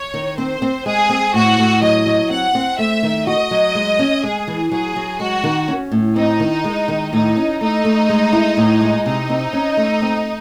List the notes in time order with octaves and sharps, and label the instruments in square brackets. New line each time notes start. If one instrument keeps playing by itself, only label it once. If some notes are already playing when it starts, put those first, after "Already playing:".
Already playing: [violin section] C#5
[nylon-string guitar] D#3
[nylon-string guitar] C4 [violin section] C5
[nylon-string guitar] C4
[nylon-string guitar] G#3 [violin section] G#4
[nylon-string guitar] C4
[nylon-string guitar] A2 [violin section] F#4
[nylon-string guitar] A2
[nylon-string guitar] F#3 [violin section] D#5
[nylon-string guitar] F#3
[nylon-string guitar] C4 [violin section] F#5
[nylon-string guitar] C4
[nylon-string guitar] A3 [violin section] E5
[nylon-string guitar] D#3
[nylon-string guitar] F#4 [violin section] D#5
[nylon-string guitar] F#3
G#3
C#4
[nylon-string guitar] G#3 [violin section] G#4
[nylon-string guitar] E3
[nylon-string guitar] F#3 [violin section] G#4
[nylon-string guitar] F#3
[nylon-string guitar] G#3 [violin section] F#4
[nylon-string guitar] D#3
C#4
A2
[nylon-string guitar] C4 [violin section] D#4
[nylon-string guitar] D#3
G#3
D#3
[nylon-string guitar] A2 [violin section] D#4
[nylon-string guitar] C#4
[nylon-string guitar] A3 [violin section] D#4
[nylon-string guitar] A3
G#3
E4
A2
G#3
[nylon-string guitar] C3 [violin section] D#4
[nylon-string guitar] C4
C#4
A3
C4